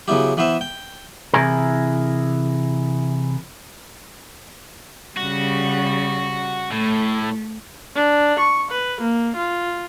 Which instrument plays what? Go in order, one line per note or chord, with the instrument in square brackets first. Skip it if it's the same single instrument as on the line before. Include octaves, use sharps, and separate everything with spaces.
[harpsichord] C#3 F#3 B3 E4 G4
E3 B3 B4 C5 E5
G5
[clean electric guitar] C3 E3 E4 G#4 A#4
[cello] C#3 G3 [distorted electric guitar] F#4
[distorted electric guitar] A2 [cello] A3
[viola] D4
C#6
B4
A#3
F4